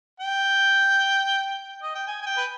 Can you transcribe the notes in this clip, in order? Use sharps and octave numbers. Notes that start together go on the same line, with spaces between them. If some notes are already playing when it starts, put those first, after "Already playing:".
G5
D#5
G5
G#5
G#5
G5
B4